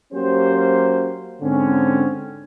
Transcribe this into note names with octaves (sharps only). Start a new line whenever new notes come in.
F#3 A#3 C#4 F#4 G4 C5
G#2 D3 C4 C#4